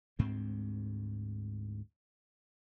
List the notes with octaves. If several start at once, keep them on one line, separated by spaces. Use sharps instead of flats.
D2 G#2 C4